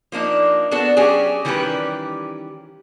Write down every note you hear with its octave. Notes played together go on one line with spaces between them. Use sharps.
F3 A#3 D4 D#4
B3 D4 F#4 A4
F#3 C#4 D4 G4 G#4
D#3 E3 G3 C#4 G4 B4